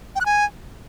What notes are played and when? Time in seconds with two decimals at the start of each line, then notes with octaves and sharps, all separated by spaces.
0.16 G5
0.21 F#6
0.26 G#5